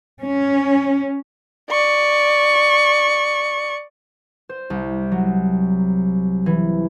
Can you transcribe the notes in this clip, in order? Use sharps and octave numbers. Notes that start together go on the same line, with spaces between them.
C#4
D5 C#6
C5
C2
F#3
E3